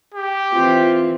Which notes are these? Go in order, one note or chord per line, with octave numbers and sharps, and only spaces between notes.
G4
E3 C4 F4